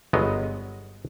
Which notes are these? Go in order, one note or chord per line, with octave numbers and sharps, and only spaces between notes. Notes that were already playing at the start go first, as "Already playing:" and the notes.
G1 F#3 G#3 B3 D#5